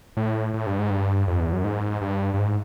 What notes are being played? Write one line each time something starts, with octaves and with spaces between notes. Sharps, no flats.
A2
A2
G2
G#2
G2
F2
E2
F#2
G#2
G2
G2
G#2